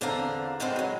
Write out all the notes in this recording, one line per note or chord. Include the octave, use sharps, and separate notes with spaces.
E2 D3 C4 D4 F5 A#5
A2 D3 D#3 G#3 B3 C4
F#3 G#3